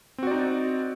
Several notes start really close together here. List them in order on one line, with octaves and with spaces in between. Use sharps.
C4 F#4 D5 D#4